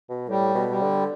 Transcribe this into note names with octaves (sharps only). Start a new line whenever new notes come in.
B2
A2 G3
B2
G3
D3